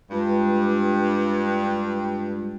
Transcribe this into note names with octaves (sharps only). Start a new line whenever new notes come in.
G2 G#3 F4 B4